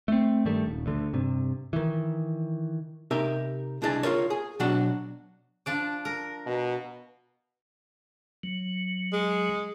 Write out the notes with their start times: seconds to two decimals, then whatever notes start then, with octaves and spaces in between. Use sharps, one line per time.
0.08 A3 C4
0.45 G2 D#3 G3 A3
0.66 D#1
0.86 D2 D3
1.13 G2 C3
1.73 D#3 E3
3.11 C3 D#4 G4 A#4 E5
3.82 C2 D4 E4 G#4 D#5 A5
4.03 F4 G4 A#4 C#5
4.30 G#4
4.60 B2 F#3 D4 F#4 F#5
5.66 F3 D4 D5
6.05 A#4
6.46 B2
8.43 F#3
9.13 G#3